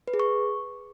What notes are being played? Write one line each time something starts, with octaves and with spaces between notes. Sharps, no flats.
B4
G#4
C#6